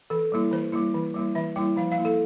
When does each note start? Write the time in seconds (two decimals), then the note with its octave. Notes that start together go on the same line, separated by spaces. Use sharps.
0.10 E3 A4
0.32 G3 A#3 E4
0.52 E3 C5
0.73 G3 A#3 E4
0.94 E3
1.14 G3 A#3 E4
1.35 E3 E5
1.56 G3 A#3 E4 G5
1.77 F3 F5
1.92 F5
1.98 A#3 E4
2.05 A4